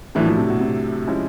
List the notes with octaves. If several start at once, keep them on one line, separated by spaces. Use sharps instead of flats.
A2 E3 F#3 A3 D4
F3
C3
B2
C3
F3 G#3 C#4 E4